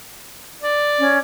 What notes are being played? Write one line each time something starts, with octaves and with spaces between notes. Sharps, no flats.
D5
C#4